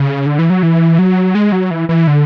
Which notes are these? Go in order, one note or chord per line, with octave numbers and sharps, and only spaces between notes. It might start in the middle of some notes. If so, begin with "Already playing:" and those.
Already playing: C#3
D3
E3
F#3
E3
F#3
G#3
F#3
E3
E3
D3